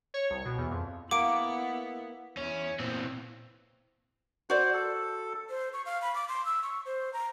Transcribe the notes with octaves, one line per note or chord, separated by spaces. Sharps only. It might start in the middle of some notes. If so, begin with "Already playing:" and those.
C#5
C2
B2
E2
F2
A#3 B3 E4 F#5 D6 D7
E2 C#4 E4
A#2 E3 B3 C4
F#4 C5 D5
A4
C5
C#6
F5
B5
D6
C6
E6
C#6
C5
A#5